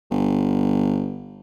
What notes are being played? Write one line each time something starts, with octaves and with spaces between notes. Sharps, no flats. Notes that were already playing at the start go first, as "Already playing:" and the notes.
G1